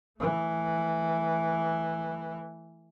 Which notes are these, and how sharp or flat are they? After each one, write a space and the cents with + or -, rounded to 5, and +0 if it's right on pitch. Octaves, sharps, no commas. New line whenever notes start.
E3 +0 A3 +0